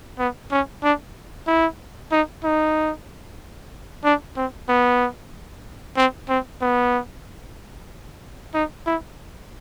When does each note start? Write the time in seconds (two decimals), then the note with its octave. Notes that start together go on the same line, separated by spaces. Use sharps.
0.19 B3
0.51 C#4
0.83 D4
1.47 E4
2.12 D#4
2.44 D#4
4.04 D4
4.36 C4
4.69 B3
5.97 C4
6.29 C4
6.61 B3
8.54 D#4
8.86 E4